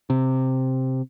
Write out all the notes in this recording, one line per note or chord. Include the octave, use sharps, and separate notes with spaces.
C3